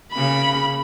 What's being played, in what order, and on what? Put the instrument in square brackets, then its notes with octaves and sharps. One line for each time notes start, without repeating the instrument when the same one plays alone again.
[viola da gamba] C#3 A#3 [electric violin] B5